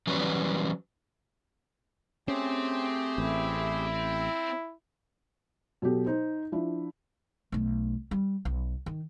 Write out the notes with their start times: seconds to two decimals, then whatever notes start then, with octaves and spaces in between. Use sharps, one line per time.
0.07 E3 F#3 G3 C#4 B4
2.28 A3 C4 C#4 G4 G#4 C5
3.18 A1 E4
5.82 B2 F#3 G4 A4
6.06 D#4 C5
6.52 F3 D4 E4
7.52 B1 A3
8.11 G3
8.45 B1
8.86 D#3